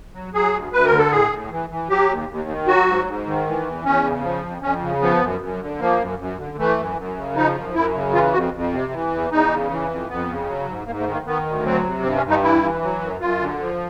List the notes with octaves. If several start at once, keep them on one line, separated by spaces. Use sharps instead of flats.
F#3
F#3 G#4
D2
D2 B4
A#4
D3
A4
A2 G#4
A2
E3
E3
F#3 G4
D#2
D#2
D#3
F#3 F#4
G#2
G#2
D#3
E3
E2
E2 C#4
C#3
F3
F2
F2 C#4
C#3
F3 B3
F#2
F#2
D3
F3 A#3
F#2
F#2
D3
E3 A3
F#2
F#2
C#3
F3 D#4
F#2
F#2 E4
C#3
E3 F4
F2 F#4
F2
C3
E3
E2
E2 D#4
C#3
E3
F2
F2 B3
C#3
F#3
G#2
G#2 A#3
A3
D#3
A#3
D#3 B3
D2
F#3 C4
C3
G2 C4
C#4
G2
D#4
E3 E4
E3
F#3
F#2
F#2 F4
D3
F3